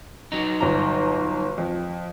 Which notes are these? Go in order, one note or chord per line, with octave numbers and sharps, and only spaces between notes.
F#3 D#4
G1 A#5
F2